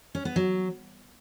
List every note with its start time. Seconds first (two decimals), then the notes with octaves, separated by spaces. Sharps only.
0.15 C#4
0.25 B3
0.36 F#3